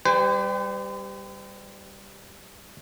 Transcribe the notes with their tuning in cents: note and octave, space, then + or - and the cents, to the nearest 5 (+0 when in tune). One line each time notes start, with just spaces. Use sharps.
G3 +5 C5 -45 G5 +40